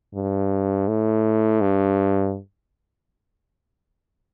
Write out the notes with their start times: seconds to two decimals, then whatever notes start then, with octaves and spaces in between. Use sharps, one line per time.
0.14 G2
0.88 A2
1.62 G2